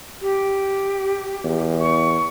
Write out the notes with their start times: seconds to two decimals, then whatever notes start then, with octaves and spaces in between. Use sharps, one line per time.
0.22 G4
1.44 E2
1.80 C#6